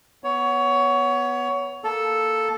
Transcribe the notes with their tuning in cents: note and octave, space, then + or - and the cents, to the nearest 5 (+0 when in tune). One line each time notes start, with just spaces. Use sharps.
B3 +0 C#5 +20
A#3 +0 A4 +0